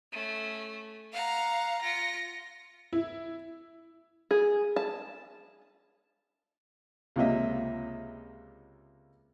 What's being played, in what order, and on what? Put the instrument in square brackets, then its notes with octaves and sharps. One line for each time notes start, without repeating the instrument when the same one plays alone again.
[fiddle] A3 C#4
[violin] F5 [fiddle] F#5 A#5
[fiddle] F4 [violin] A#6 C#7
[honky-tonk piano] E4
[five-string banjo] G#4
A5
[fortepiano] C#2 C3 A#3 D#5 E5